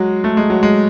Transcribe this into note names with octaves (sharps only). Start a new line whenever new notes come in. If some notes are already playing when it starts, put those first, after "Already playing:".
Already playing: F#3 G#3
A3
G#3
F#3
G#3